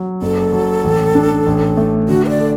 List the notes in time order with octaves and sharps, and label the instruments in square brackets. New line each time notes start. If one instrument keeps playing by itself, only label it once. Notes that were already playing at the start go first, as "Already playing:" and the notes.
Already playing: [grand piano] F#3
[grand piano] F#1 [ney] A4
[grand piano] F#3
A1
D4
A1
A3
[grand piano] D3 [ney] F#4
[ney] B4
D5
[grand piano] A4